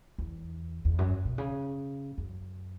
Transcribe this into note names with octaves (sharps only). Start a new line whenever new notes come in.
E2
E2
F#2
B2
C#3
F#2